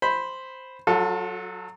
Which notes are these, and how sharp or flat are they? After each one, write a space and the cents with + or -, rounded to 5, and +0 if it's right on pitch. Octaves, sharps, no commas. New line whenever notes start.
C5 +0 B5 +0
F#3 -10 F4 +45 A4 +0